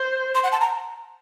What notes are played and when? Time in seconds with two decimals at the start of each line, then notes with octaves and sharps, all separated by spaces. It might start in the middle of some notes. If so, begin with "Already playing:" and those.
Already playing: C5
0.35 C6
0.43 F#5
0.52 A5
0.61 A#5